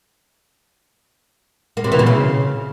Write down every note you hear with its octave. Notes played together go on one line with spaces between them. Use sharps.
A#3
C3
E3
B2
C#3